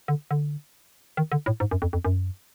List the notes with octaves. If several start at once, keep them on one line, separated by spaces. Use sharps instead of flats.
D3
D3
D#3
D3
A2
G#2
F#2
F2
F2
F#2